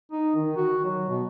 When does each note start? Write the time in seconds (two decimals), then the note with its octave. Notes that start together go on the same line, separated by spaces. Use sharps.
0.12 D#4
0.35 D#3
0.56 F#4
0.84 F#3
1.09 B2